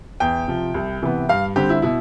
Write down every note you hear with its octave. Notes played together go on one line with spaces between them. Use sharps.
E2 G5
C3 F3
C2
C3 E3 B3
G2 F5
D3 G3 C4 G4
E4
B2 E4